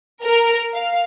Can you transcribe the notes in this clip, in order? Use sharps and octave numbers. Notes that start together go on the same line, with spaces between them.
A#4
F5